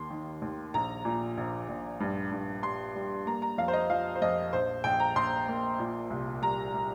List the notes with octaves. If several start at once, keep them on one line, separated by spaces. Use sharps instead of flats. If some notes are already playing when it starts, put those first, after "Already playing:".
Already playing: D#2 A#3 C6
D#3
D#2
A#1 A#5
A#2
A#1
A#1
G2
G2
G3 C6
G3
A#3 A#5
A#5
F2 F5
C5
D#5
F3 F5
C5
F2 D#5
A#1 C5
A#1 G5
A#5
A#1 C6
A#3
A#2
C2
G3 A#5
G3